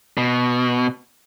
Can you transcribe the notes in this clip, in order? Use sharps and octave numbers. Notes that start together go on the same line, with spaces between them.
B2